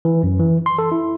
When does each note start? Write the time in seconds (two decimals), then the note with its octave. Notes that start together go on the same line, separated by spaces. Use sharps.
0.05 E3
0.23 F#2
0.39 E3
0.66 C6
0.79 A4
0.92 E4